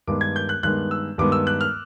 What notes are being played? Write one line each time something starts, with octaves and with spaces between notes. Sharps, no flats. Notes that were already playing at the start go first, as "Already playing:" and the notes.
G2 D#3 G#3 B3 D6
G#6
G6
F#6
G2 D#3 G#3 B3 F#6
E6
G2 D#3 G#3 B3 D6
E6
F#6
F6